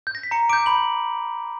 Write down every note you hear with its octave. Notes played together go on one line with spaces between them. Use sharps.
G6
A#6
B6
A#5 C#7
D6 G6 D7
B5 F#7